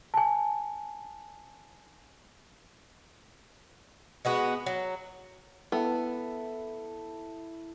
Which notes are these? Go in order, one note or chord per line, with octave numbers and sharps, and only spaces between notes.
G#5 A5
G#3 B3 F#4
F#3
B3 E4 A4